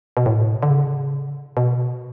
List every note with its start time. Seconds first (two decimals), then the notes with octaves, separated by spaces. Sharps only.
0.17 B2
0.26 A2
0.63 D3
0.70 C#3
1.57 B2